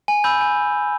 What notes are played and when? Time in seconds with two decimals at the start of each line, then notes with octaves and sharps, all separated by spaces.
0.08 G#5
0.24 B5 E6 G6
0.41 G#5